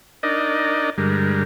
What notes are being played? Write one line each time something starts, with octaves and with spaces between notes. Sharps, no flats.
D4 D#4 A#4 D5 D#5
G2 D3 G3 G#3 A#4